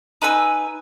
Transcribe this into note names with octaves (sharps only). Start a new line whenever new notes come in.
D#4 B4 G#5 E6